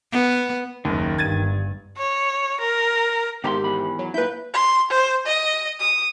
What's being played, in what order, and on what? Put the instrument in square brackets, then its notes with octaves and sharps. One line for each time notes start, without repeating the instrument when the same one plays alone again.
[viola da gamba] B3
[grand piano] F#1 D#2 [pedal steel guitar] D#3
[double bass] G1 G2 [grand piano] G#6 A6 D#7
[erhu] C#5
A#4
[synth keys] G#2 D#3 G4 [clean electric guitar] B2 A#5 C6
[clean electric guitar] E2 B5
[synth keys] F#3
[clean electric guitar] A#2 E4 [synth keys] B4 G6
[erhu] C6
C5
D#5
D#6